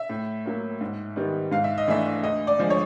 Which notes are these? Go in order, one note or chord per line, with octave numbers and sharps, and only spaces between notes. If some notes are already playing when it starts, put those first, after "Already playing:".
Already playing: E5
A2
F#3 A#3
G#2
D#3 G3 B3
G#2 F5
E5
D#5
E3 A3 D4 E5
D2 D#5
D5
D3 F3 G#3
C#5